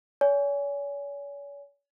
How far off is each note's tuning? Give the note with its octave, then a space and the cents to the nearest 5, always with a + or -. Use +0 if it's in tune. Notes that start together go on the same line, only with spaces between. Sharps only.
C#5 +40 G#5 +0